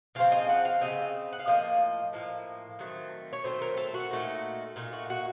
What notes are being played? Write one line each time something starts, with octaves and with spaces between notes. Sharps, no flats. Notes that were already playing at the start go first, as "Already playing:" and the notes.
C#3 F3 C4 F5
D#5
F#5
F5
C#3 F3 C4 D#5
F#5
F5
A2 F3 A#3 D#5
A2 F3 A#3
D#3 F#3 A3 C4
C#5
D#3 F#3 A3 C4 C5
A#4
A4
F#4
A#2 A3 D#4
A#2 A3 D#4
F#4
F#4